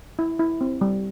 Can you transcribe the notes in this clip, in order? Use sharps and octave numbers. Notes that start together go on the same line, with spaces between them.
E4
E4
C4
G3